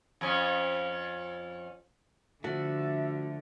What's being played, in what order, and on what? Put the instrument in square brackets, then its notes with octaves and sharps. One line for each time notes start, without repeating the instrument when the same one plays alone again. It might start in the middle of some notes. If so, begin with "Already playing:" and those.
[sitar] F2 C#4
[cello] D3 [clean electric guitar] F3 A3 [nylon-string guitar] F#4 [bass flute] E5